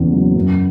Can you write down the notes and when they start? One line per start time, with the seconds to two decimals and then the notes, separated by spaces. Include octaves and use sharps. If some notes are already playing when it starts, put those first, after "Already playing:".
Already playing: E2 C#3
0.13 F#3
0.35 F#2